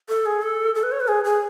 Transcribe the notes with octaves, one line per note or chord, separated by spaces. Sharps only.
A4
G#4
A4
A4
B4
C#5
B4
G#4
G#4